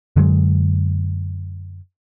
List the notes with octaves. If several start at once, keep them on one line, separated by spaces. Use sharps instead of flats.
F#2 D3 F#3 G#3